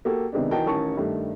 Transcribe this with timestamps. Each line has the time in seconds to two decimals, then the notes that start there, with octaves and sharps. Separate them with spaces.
0.05 A#3 F#4 G4 A4
0.33 C3 D#3 G#3 B3 D4
0.51 E3 D#4 F#4 A#4 G5 A5
0.66 A1 D#3 C#4 A#4 A5 C#6
0.97 G2 D#3 A3